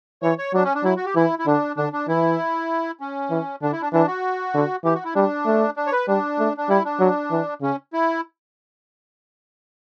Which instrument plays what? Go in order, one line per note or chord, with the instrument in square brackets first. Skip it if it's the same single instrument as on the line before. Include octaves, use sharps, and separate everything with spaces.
[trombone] E3 [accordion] C#5
[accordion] C#5
[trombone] F#3 [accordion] D4
[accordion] C#4
D4
[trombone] F#3 [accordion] E4
[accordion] F#4
G4
[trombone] E3 [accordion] E4
[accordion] E4
[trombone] D3 [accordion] D4
[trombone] D3 [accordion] D4
[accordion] D4
[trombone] E3 [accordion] E4
[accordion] C#4
[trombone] E3
[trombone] D3 [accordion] D4
[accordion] E4
D4
[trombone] E3 [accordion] D4
[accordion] F#4
[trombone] D3
[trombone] E3 [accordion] G4
[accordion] F#4
E4
[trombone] G3 [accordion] D4
[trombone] A3
[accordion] D4
C#5
B4
[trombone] G3 [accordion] D4
[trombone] A3
[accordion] D4
[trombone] G3 [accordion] E4
[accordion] D4
[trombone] F#3
E3
[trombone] C#3 [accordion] C#4
[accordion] E4